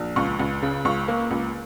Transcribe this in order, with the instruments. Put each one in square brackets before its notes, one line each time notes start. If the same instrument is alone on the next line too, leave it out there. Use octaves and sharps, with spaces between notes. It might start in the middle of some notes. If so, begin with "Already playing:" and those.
Already playing: [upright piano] A#1
C#2 C#6
C#2
C#3
C#2 C#6
A#3
C#2